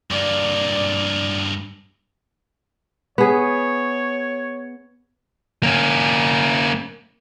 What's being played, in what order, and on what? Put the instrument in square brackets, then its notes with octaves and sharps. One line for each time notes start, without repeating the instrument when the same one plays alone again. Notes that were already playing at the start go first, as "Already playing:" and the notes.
[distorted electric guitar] G2 A#3 [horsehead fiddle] D5
[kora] B3 G#4 [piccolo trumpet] C#5
[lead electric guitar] A#3 C#4